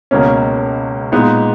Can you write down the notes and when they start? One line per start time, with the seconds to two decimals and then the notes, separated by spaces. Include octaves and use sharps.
0.11 C#2 B2 A#3 C#4
1.12 A#2 G#3 B3 D#4